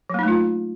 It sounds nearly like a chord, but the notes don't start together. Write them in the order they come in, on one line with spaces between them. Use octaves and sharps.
F#3 A#3 D#4 A3 F4